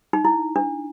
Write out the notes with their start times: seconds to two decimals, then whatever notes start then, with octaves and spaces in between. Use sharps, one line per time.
0.13 D#4
0.25 E4
0.56 D4